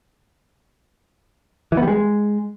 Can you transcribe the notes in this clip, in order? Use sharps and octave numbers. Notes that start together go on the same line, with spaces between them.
E3
B3
G3
G#3